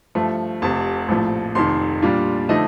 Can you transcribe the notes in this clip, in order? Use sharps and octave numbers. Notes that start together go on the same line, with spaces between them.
G2 F3 A3
F1 F2 C3 A5
A#1 A2 F3
F1 F2 D#3 C6
A#2 G3 D4 F4
D3 F3 A3 D#4 D#5